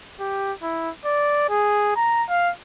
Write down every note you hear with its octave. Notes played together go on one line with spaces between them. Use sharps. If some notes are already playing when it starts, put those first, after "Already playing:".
G4
E4
D5
G#4
A#5
F5